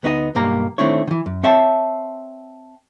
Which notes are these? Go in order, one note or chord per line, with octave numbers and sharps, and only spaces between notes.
D2 B3 D#4 F#4 D#5
B1 G2 A#3 G4 A#5
D#3 A3 C4 D4 E4 C#5
D#3 E3
F#2
C4 C#5 E5 G5 A5